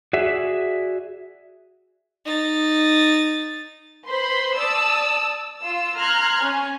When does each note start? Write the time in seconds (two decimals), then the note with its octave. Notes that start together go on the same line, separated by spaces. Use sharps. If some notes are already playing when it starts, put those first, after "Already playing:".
0.13 F#4 G#4 D5 E5
2.26 D#4 A6
4.07 B4 C5 B5 C6
4.58 D5 A5 D#6 E6
5.62 F4 E6
5.98 A#5 C6 F6 F#6 G#6
6.43 C#4 G#5